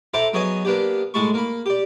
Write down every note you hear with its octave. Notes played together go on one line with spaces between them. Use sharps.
E4 A4 C5 F#5 A#5 D6
F#3 B3 G#4 C#5 D#5
A#3 B3 D4 G4
A2 G#3 A5 B5 C#6
A#3 B5
G4 D5